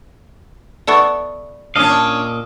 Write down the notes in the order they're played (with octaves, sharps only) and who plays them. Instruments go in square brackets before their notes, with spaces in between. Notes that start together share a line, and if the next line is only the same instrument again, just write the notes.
[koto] B3 E4 A4 [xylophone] D5 C#6
[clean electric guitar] A#2 D#5 F5 [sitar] C#4 D4